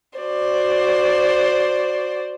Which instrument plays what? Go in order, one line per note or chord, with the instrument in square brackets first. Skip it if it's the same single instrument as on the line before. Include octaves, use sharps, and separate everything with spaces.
[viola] F#4 D5 [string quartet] C5